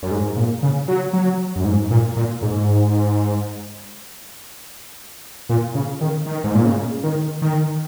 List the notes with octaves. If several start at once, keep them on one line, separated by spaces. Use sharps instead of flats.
F#2
G#2
A#2
C#3
F#3
F#3
F#2
G#2
A#2
A#2
G#2
A#2
C#3
D#3
D#3
G#2
A#2
C#3
D#3
D#3